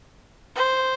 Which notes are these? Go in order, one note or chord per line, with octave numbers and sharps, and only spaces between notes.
C5